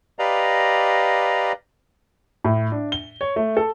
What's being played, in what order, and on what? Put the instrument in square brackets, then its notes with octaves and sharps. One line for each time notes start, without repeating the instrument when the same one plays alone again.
[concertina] G4 B4 D5 D#5 F5 A#5
[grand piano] A2
D4
G7
C#5
A3
A4